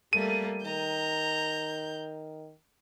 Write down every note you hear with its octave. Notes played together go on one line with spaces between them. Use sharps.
G3 A3 A#3 D#7
D#3 A#5 G6